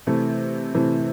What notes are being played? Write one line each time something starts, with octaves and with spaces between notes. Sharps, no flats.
C3 E3 A3
C3 E3 A3